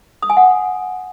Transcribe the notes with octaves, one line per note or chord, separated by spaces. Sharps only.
D#6
G#5
F#5